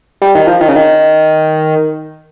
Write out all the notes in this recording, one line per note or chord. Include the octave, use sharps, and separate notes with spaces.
G3
D#3
F3
D#3
C#3
D#3